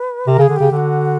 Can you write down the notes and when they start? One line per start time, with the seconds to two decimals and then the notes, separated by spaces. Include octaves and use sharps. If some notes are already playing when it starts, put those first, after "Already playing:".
Already playing: B4
0.27 C3 A#4
0.38 C#3
0.41 G#4
0.49 D3
0.56 C#3 G4
0.71 D3 G4
0.76 F#4